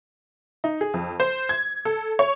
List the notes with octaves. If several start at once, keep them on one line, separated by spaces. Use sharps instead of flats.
D#4
G#4
F2
C5
G#6
A4
C#5